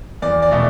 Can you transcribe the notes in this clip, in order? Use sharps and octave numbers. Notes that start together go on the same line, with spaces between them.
E2 D5
D5
B2 A3